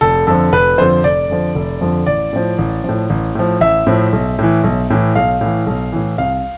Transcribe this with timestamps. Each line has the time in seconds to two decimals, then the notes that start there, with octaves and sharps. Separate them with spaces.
0.01 F1 A4
0.27 F2 D3 F3 A4
0.52 F1 B4
0.78 F2 D3 F3 C5
1.04 F1 D5
1.29 F2 D3 F3
1.55 F1
1.81 F2 D3 F3
2.06 A1 D5
2.33 A2 F3
2.58 A1
2.84 A2 F3
3.10 A1
3.35 A2 F3
3.61 A1 E5
3.87 A2 F3
4.13 B1
4.39 A2 E3
4.64 B1
4.90 A2 E3
5.15 B1 F5
5.41 A2 E3
5.66 B1
5.92 A2 E3
6.18 C2 F5